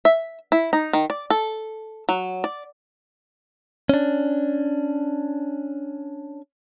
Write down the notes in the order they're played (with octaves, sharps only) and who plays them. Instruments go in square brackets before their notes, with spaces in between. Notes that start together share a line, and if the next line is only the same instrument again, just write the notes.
[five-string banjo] E5
E4
D#4
D#3
D5
A4
F#3
D5
[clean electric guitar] C#4 D4